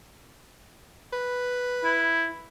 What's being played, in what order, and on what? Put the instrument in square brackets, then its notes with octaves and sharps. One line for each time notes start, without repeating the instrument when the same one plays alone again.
[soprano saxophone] B4
[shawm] E4